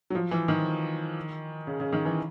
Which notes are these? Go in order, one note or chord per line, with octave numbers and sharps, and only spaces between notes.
F#3
F3
E3
D#3
C#3
C#3
D#3
E3